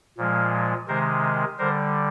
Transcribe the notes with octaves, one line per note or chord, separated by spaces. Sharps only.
A#2 F3 G#3
C3 D#3 G#3 A#4 C5
D3 G3 A#4 C5